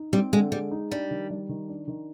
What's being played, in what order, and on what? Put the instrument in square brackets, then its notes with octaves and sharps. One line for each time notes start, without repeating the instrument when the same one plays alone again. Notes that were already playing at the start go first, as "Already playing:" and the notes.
Already playing: [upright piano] D#4
[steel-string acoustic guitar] G3 [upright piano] C4
[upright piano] D3 [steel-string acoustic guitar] G#3
[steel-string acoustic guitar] G3 [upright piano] G#3
[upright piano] D#4
[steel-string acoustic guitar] G3 [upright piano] D4
[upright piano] D#3
G3
D#3
D4
D#3